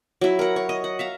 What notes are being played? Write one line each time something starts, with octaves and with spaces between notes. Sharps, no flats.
F#3 E4
A#4 F#5
C#5
D#5
F#5
E5 F5 A#5